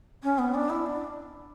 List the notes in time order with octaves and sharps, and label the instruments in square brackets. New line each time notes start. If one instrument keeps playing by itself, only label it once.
[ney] C#4
B3
D4
E4
D4